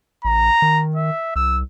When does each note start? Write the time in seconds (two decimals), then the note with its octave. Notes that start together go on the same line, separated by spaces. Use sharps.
0.25 A1 A#5
0.62 D#3
0.96 E5
1.36 C2 E6